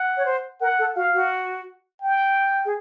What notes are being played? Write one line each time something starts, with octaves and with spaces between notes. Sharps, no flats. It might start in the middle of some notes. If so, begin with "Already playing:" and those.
Already playing: F#5
C#5
C5
A#4 F#5
A4
F#4 F5
F#4
G5
G#4